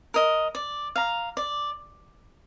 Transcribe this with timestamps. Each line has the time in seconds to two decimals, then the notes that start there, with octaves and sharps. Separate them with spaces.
0.14 A#4 D#5
0.55 D5
0.96 F5 A#5
1.37 D5